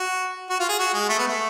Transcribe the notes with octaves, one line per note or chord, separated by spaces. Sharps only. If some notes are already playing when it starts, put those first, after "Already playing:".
Already playing: F#4
F#4
F4
G#4
F#4
G#3
A3
B3
A3